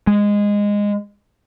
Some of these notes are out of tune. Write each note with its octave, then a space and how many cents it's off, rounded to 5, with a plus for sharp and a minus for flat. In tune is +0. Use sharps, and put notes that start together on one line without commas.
G#3 -15